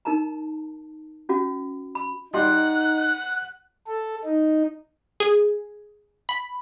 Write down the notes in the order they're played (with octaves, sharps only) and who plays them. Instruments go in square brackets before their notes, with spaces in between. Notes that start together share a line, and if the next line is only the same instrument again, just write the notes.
[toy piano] D#4 A#4 A5 A#5
C#4 F#4 F5
B5
[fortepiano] G3 D#5 C6 [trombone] D#4 [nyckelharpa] F#5 [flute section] F#6
[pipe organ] A4
D#4
[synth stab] G#4
B5